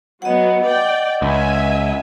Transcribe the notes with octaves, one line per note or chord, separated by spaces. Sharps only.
F#3 B3 D#5 F#5
D5 G5
C#2 E5 G#5